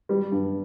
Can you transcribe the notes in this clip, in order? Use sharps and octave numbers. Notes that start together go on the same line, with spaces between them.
G3
G2